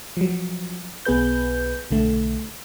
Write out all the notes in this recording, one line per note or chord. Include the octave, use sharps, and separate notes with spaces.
F3 F#3
B1 B3 G#4 B4 G6
B1 D3 A3